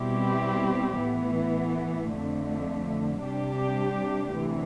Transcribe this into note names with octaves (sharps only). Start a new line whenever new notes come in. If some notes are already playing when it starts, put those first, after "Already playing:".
Already playing: B2 G3 C4 E4 G4
A2 E3 B3
F2 D3 A3
C3 G3 D4 G4
D2 C3 E3